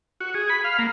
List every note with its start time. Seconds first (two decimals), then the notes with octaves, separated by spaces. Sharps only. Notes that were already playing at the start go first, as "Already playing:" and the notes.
0.20 F#4
0.34 G#4
0.50 B5
0.64 F5
0.79 A#3